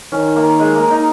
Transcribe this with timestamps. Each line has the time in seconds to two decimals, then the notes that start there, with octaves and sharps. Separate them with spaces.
0.12 D#3 C#4
0.36 A#3
0.59 G#3
0.75 A#3
0.91 D#4